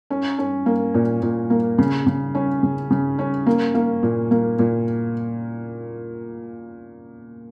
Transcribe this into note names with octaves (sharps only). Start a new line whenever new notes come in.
C#4
C#4
A#3
A#2
A#2
A#3
C#3
C#3
C#4
C#3
C#3
C#4
A#3
A#3
A#2
A#3
A#2